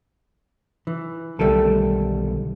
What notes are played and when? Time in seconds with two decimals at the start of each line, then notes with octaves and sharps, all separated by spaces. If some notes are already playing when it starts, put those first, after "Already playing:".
0.87 E3
1.39 B1 D3 D#3 G3 A3 A4